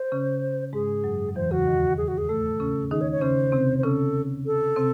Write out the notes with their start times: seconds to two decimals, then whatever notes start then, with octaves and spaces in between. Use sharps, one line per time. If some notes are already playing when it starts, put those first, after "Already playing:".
Already playing: C5
0.12 C#3 C#4
0.73 G#2 G#3 G#4
1.04 F#2 F#3
1.29 F#3
1.35 E2 E3 C5
1.51 C#3 F#4
1.66 D#2 D#3
1.97 G#4
2.08 F#4
2.18 G#4
2.28 A2 A3 A4
2.60 C#3 C#4
2.91 D#3 D#4 G#4
3.01 C#5
3.11 C#5
3.21 C#3 C#4 C5
3.52 C3 C4
3.78 C5
3.83 C#3 C#4 A4
4.46 A4
4.76 C3 C4